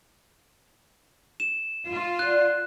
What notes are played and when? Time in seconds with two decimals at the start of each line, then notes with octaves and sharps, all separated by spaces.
1.40 E7
1.87 F4
2.19 F#4 D5 F#6